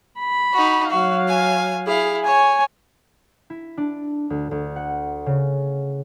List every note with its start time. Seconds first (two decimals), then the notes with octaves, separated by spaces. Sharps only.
0.20 B5
0.53 D#4 F#4
0.90 F#3 F#4 F5
1.28 G#5
1.86 E4 G#4 F5
2.25 C#5 G#5
3.50 E4
3.77 D4
4.30 D2
4.51 D2
4.76 F#5
5.26 C#3